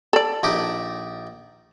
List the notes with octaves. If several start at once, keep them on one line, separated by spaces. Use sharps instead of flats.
A4 D5
A#1 D#4 G4